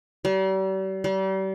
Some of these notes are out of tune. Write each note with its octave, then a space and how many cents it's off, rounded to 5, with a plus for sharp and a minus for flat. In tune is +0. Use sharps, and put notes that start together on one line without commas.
G3 -40
G3 -35